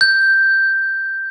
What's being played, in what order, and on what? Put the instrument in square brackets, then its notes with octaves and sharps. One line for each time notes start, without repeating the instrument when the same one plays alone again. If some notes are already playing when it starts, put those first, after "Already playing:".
[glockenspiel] G6